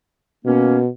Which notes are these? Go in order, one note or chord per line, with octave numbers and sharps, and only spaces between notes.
B2 A#3 C#4